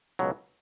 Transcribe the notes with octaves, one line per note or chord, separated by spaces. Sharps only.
C#2 B2 F#3